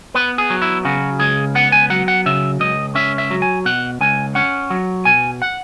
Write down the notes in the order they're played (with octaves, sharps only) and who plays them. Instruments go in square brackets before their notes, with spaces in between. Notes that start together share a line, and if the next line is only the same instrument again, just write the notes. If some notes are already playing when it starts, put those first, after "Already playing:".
[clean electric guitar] B3 B4
G#4
F#3
E4
C#3 F#4
C#2 G#4
B3 F#5
G#5
F#3 F#5
F#5
C#3 E5
C#2 D#5
C#4 E5
E5
F#3
G#5
B2 F#5
C#2 G#5
C#4 F#5
F#3
B2 G#5
F#5